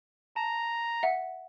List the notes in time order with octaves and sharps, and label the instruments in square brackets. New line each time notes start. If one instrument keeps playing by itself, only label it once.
[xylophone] A5 [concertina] A#5
[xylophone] E5 F#5